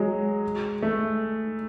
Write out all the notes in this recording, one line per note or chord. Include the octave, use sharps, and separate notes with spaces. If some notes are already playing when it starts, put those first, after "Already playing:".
Already playing: F#3 G#3
A3